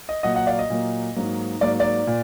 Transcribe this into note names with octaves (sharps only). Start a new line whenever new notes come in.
D#5
A#2 F#3 A#3 D#5 F#5
D#5 F#5
D5 F5
D#5
A#2 F#3 A#3
G#2 F#3 A#3
G#2 F#3 A#3 D5
D5
A#2